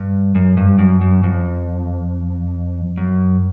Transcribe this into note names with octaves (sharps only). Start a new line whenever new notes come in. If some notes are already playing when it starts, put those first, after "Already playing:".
Already playing: G2
F#2
G2
F#2
F#2
F2
F#2